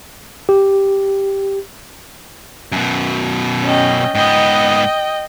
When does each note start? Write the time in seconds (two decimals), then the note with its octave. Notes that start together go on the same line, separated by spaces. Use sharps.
0.49 G4
2.72 F#2 B2
3.64 C#4 D#5 G5
4.15 G#2 B3 D#5 G5